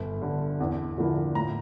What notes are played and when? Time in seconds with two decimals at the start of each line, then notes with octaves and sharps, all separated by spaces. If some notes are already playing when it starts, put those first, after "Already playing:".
Already playing: G1
0.21 G2 D3
0.60 E2
0.98 D3 F3 A#3 E4
1.35 A2 A#5